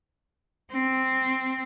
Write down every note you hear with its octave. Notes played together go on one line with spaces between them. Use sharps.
C4